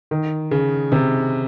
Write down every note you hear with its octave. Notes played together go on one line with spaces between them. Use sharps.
D#3
C#3
C3